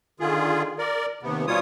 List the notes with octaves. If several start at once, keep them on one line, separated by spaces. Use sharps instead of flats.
D3 D#3 F4 G#4
A#4 D5
D#2 C3 B3
B2 F3 G3 F4 C#5 D#6